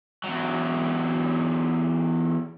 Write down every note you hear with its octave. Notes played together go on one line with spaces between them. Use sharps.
E2 F#3